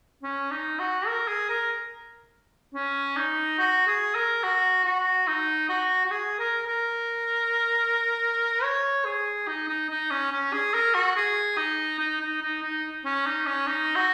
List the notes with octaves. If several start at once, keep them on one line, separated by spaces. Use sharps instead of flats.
C#4
D#4
F#4
A#4
G#4
A#4
C#4
D#4
F#4
G#4
A#4
F#4
F#4
D#4
F#4
F#4
G#4
A#4
A#4
C#5
G#4
D#4
D#4
D#4
C#4
C#4
G#4
A#4
F#4
G#4
D#4
D#4
D#4
D#4
D#4
C#4
D#4
C#4
D#4
F#4